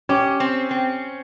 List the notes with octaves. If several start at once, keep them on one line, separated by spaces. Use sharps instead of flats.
C#4 G4
C4
C4